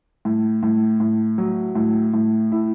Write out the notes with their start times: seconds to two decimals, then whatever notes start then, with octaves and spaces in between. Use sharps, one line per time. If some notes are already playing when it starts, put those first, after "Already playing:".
0.25 A2
0.63 A2
1.00 A2
1.38 F#3
1.75 A2
2.14 A2
2.52 E4